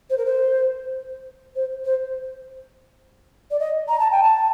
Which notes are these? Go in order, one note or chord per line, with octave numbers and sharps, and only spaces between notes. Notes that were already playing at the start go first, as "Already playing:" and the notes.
C5
A#4
C5
C5
C5
D5
D#5
A#5
A5
G5
A5